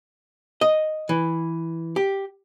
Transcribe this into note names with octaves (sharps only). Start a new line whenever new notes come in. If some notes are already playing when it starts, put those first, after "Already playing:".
D#5
E3
G4